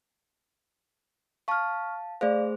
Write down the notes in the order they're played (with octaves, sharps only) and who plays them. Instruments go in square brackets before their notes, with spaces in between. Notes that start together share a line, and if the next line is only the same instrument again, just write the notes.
[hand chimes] F5 A5 [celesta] C#6 F6
[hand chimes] A3 G#4 C5 [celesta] D5 F5